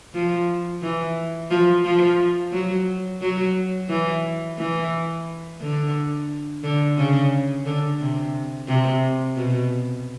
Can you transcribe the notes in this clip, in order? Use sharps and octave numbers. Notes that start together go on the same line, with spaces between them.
F3
E3
F3
F3
F#3
F#3
E3
E3
D3
D3
C#3
D3
C3
C3
B2